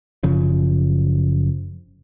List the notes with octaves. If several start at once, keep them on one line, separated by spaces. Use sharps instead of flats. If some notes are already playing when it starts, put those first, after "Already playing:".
F#1 F#2 C#3 F3